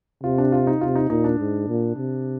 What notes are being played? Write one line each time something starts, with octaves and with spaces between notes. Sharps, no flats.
C3 F4
D4
F4
D#4
C3 F4
D#4
A#2 D#4
D4
G#2
A#2
C3